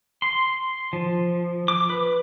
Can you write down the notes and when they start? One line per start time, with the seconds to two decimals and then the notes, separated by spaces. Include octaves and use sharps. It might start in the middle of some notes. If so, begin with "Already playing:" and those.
0.22 C6
0.93 F3
1.68 D6
1.90 B4